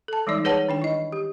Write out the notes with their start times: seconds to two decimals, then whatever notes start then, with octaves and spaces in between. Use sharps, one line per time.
0.08 A4 A5
0.27 E3 G3 G#3 D#4 D5
0.44 G#4 B4 C#5 F#5 A5
0.69 D#3 D4 G5
0.82 E4 D#5
1.12 G4